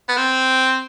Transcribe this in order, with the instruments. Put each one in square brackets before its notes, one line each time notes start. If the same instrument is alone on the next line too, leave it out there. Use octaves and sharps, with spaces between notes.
[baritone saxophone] B3
C4